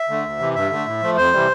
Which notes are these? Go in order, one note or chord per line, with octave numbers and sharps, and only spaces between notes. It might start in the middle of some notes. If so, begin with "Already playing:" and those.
Already playing: E5
D3 A3
D2
C3 E3
G2 E5
D3 A3
A2
F3 A3
F2 C5
C3 E3 G3